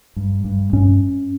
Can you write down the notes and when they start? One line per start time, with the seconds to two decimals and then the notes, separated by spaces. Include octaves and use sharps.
0.16 G2
0.45 G2
0.73 G2 C#4